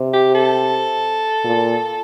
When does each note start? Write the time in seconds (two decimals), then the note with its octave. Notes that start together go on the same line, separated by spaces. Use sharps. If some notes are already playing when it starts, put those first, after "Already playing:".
Already playing: C3
0.13 G4
0.35 A4
1.44 A#2